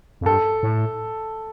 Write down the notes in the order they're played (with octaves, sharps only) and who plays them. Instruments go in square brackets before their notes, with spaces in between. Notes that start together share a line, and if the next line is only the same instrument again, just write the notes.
[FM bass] F2
[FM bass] G2 [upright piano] A4
[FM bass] A2